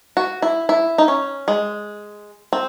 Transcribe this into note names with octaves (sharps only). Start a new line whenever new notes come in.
F#4
E4
E4
D#4
C#4
G#3
C4